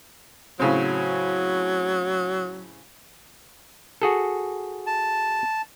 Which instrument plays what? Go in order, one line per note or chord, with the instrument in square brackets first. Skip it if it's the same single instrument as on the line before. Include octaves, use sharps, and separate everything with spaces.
[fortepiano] A2 C#3 C4 [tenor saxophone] F#3
[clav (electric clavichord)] F#4 G#4 A4
[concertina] A5